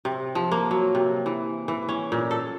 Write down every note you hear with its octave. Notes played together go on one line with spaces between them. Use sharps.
C3
F3
A#3
F#3
C3
E3
E3
C#4
A#2
A4